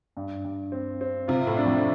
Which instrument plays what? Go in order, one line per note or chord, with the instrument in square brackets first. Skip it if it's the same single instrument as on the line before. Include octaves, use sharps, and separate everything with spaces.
[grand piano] G2
G2
C4
C4
[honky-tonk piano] C3 [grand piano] F4
[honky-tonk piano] A2
[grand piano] D4
[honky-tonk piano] F2